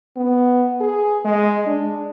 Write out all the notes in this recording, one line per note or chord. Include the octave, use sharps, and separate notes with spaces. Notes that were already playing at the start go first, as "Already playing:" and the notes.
B3
G#4
G#3
D4